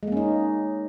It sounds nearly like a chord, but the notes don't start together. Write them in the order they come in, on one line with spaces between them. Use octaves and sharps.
G#3 A#3 C#4 D#4